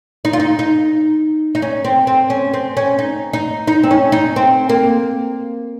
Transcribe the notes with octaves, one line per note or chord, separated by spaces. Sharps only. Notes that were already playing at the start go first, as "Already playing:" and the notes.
D#4
F4
D#4
D#4
D#4
C#4
C4
C4
C#4
C4
C#4
D#4
D#4
D#4
C4
C#4
D#4
C4
A#3